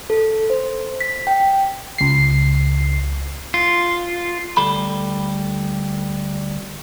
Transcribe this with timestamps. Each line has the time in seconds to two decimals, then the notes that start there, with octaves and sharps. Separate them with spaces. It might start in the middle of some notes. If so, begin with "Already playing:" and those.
0.10 A4
0.50 C5
1.01 B6
1.27 G5
1.98 C#2 C7
3.54 F4
4.57 D2 G3 A4 B5